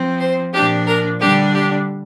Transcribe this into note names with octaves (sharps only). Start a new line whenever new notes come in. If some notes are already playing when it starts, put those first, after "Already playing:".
Already playing: F3 C4
C5
A#2 F3 D4 G4
A#4
D3 G3 D4 G4
G4